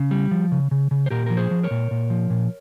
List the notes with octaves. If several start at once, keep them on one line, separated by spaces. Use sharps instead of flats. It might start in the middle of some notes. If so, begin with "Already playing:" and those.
Already playing: C#3
G3
F3
C#3
C#3
C#3
C5
A#2 G4 A#4
F3 A#4
G#4 C5
F3
A#4 C#5
A#2
A#2
F3
A#2